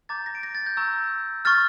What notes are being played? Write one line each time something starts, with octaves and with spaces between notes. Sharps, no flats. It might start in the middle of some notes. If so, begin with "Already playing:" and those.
A#5 D6 G6 A6
A#6
D7
A#6
A6
G6
A#5 C#6 E6 G6
C#6 F6 A6